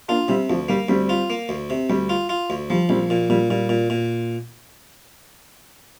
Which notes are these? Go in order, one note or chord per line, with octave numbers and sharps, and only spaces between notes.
A#3 D4 F4
C3 G3 C4
D2 F3
G3 A#3
D2 G3 C4
F4
A#3
D2
C3
D2 G3
F4
F4
D2
F3 G3
A#1 G3 C4
A#2
A#2 G3
A#2 G3
A#2
A#2